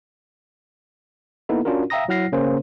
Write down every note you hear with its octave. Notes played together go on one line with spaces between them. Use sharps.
A#3 B3 D#4 E4 A4
C#4 D4 F4 F#4 A#4
E5 F5 G5 A#5 D#6 A#6
F#3 E4 F#5 F6 A#6 C7
C#3 A#3 C#4 A#4 C5